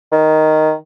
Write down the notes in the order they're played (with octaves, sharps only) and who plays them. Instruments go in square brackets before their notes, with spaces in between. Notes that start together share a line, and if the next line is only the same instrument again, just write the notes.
[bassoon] D#3